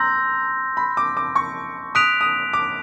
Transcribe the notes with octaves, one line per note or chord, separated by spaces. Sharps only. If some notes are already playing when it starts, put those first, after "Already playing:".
Already playing: A#5 C6 E6 G6 A#6
B5
D6
D6
C#6
D#6 F#6 B6 D7 F7
D#6
D6